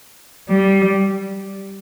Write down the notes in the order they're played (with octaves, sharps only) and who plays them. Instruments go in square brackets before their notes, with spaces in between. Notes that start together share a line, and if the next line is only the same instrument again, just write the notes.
[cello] G3